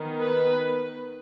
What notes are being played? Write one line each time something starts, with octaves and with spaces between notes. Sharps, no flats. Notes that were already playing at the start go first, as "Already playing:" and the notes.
Already playing: D#3 B3
B4